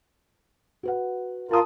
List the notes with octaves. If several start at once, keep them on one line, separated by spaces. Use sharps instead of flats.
F#4 B4 F#5
F4 A#4 A5 D#6